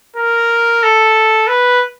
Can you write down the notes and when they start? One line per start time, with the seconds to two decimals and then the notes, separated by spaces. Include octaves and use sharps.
0.17 A#4
0.83 A4
1.47 B4